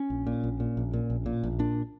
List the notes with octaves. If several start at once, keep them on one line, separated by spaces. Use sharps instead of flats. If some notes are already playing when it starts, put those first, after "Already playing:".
Already playing: C#4
A#1
A#2
A#1
A#2
A#1
A#2
A#1
A#2
A#1
A#2 D4